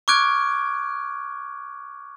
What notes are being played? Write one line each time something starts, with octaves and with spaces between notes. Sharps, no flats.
C#6 D6 F6 F#6 G#6 D7